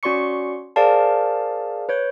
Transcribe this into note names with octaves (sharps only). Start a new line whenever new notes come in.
C#4 F#4 D5 C6 C#6 C#7
G#4 A#4 C5 D5 F5 A5
B4 C#5 G6